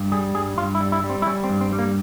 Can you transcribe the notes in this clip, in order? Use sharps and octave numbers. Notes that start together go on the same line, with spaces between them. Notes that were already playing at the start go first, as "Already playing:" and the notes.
Already playing: G2
G3 G#4
G2 G#4
G2 F4
E4
G3
E4
G3
C4
E4
G3 C#4
C4
G2
C4
G3
A#3